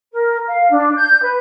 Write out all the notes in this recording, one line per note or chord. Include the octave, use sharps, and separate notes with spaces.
A#4
F5
D4
G6
B4